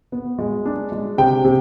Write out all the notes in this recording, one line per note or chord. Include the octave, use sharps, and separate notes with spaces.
B3
G#3
D4
G#3
C3 G5
C3